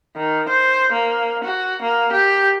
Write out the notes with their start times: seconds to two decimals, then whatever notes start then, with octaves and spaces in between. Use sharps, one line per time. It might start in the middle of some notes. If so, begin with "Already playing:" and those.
0.16 D#3
0.49 C5
0.93 A#3
1.44 F#4
1.82 A#3
2.12 G4